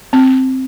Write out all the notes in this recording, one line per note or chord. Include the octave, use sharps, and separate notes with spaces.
C4